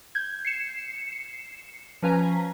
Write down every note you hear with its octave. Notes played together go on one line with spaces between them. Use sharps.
G6 G#6
C7 C#7 E7
F3 C#4 B4 G#5 A#5